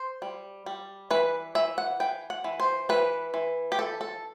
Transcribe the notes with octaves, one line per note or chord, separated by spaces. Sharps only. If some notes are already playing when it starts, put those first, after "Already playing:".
Already playing: C5
G3
G3
E3 B4
E3 E5
F#5
E3 G5
F#5
E3
C5
E3 B4
E3
G4
E3 A4
A4